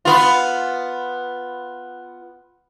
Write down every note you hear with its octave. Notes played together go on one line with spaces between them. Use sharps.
B3 F4